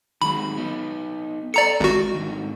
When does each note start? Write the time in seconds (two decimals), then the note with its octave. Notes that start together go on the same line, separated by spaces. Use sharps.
0.22 D#3 F#3 G#3 B5
0.57 B3 D#4
1.54 A4 D5 G5 A#5 C#7
1.81 G#1 G#3 F#4
2.15 G#2 D3 D#3